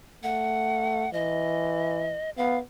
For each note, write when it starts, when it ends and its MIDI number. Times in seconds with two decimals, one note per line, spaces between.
0.23 1.07 57
0.23 1.12 78
1.13 2.17 52
1.13 2.30 75
2.37 2.61 59
2.37 2.58 77